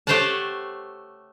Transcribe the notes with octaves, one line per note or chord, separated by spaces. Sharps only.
A3 G4 C5 C#5 F#5 A5